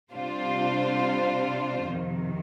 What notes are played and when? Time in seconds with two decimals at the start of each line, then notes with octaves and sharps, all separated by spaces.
0.11 C3 G3 D4 F4 C5
1.86 F2 C3 D#3